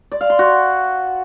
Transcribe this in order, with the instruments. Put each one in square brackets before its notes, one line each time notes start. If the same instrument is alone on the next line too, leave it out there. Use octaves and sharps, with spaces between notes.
[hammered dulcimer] D5
F5
C6
F#4